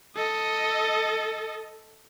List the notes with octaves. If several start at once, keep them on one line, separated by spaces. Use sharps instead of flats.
A4 D#5